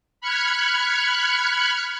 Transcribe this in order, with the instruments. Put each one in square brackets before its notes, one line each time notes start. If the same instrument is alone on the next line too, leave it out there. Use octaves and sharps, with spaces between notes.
[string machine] B5 F6 F#6 G#6 C#7